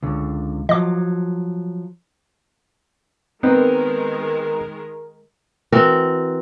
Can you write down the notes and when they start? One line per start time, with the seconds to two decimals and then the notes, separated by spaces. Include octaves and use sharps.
0.02 C#2 D3
0.69 F3 F#3 D#5 D6
3.43 D#3 G#3 B3 C4 D#4 A#4
5.72 E3 C4 F#4 A#4